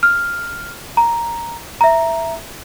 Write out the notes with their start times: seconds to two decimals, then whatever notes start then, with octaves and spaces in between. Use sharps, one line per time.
0.03 F6
0.97 A#5
1.81 E5 A#5